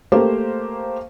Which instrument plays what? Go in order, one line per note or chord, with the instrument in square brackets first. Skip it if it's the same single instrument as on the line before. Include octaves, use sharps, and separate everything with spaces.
[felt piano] A3 A#3 G4 C5